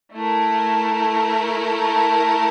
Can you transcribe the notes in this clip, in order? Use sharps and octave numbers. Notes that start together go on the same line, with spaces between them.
A3 E4 A#4